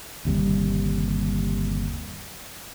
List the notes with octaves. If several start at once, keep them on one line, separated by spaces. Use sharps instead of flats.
G1 D#2 C3 G3